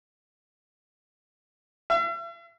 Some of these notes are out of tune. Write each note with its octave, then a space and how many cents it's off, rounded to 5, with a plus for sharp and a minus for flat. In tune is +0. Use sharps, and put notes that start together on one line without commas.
E5 +45